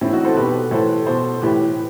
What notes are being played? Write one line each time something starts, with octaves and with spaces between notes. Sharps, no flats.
A2 E3 C4 E4
D#4 F#4
A4 C5
B2 G4 B4
A2 E3 A4 C5
B2 A4 C5
A2 E3 G4 B4